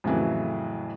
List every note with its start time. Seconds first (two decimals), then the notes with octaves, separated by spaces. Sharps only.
0.04 F2 A2 C#3 E3 F#3